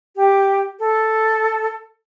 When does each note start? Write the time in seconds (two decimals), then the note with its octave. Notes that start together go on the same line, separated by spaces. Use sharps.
0.16 G4
0.79 A4